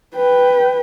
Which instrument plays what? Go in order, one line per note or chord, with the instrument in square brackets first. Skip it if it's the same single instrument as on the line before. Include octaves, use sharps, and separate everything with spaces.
[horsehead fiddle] B4 G5